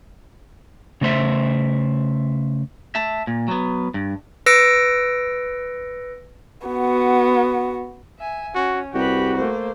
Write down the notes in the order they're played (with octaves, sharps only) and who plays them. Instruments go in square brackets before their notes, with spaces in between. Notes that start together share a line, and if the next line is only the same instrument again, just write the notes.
[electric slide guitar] C#3 A3 C5 E5
[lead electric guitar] E5 A5
A#2
F#3 B3
G2
[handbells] B4 E6 A#6 C#7 D7
[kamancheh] B3 F#4
[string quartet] E5 G#5
[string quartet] C#4 [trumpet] F#4
[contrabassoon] C2 [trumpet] F#4 [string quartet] G4 B4 B5
[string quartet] A3 A#3 C5